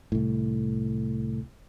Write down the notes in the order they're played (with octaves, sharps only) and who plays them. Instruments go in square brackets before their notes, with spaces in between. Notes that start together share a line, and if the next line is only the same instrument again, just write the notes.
[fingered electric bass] C2 A2